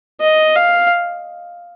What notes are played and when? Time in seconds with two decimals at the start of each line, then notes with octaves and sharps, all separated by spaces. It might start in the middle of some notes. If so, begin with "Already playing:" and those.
0.20 D#5
0.56 F5